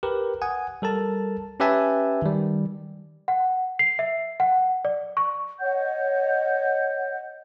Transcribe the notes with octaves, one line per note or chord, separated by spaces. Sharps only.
G4 A#4 B4
F#5 G#5 D#6
G3 A4 A#4 A5
C#4 G4 B4 E5 G#5 A5
D#3 G3
F#5
C7
E5
F#5
D5
C#6
C#5 D#5 F#5 G6